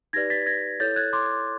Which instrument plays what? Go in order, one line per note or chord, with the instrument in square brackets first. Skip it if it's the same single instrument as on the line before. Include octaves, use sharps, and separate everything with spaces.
[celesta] D#4 G4 B4 D5 G#6 A#6
A6 B6
G#6 A#6
E4 A4 C#5 G6 A6
F#6 G#6
C6 D6